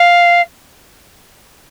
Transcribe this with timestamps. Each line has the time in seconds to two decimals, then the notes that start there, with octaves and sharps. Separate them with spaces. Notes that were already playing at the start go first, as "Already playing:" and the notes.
Already playing: F5